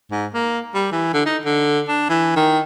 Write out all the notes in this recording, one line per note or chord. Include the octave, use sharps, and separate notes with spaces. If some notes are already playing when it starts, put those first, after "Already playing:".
G#2
A#3
G3
E3
D3
D#4
D3
D4
E3
D#3